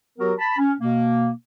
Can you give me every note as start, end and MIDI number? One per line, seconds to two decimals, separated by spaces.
0.19 0.33 54
0.19 0.33 59
0.19 0.33 66
0.19 0.33 67
0.19 0.33 70
0.38 0.57 81
0.38 0.57 83
0.57 0.72 61
0.80 1.30 47
0.80 1.30 58